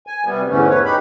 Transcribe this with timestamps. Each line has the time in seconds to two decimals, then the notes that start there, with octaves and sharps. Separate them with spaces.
0.07 G#5
0.25 C3 G3 B3
0.49 E2 G#2 D3 E3 A3 C#4
0.69 B4 C#5
0.84 D#4 G4 B5